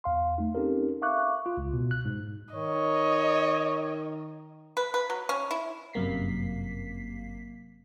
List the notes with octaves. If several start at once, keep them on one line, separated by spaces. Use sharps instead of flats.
E2 F5 C6
A3 D#4
C4 C#4 D#4 G4 A4 A#4
E5 F5 C#6 D6 F#6
F4
C#2
B2
F#6
G#2
D#3 C#5 D#5
B4
B4
F#3
C#4
E4
G1 F#2 C3 A#3 B6 C7